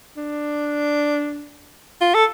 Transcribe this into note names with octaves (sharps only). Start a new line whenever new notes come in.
D4
F4
A4